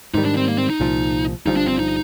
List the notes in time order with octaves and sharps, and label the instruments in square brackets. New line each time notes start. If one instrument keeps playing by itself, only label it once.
[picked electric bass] G#2 D#3 G3 [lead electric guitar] D#4
[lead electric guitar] D4
C4
A#3
C4
D#4
[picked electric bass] C2 A#2 F3
[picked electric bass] G1 G2 D3 F3 [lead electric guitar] D#4
[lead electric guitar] D4
C4
D#4